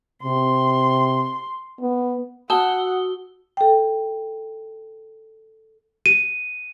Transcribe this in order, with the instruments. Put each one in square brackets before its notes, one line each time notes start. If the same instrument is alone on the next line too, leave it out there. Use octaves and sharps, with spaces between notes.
[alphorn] C3 [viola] C6
[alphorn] B3
[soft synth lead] F#4 [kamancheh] F#5 [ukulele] A5 [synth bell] D#6 E6 G7
[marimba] A4 G5
[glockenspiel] D#7